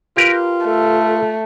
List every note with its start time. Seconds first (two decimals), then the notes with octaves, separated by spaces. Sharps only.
0.17 F4 G4 A#4 B4
0.65 A3 A4